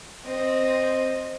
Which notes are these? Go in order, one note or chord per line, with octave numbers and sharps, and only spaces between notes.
C4 D#5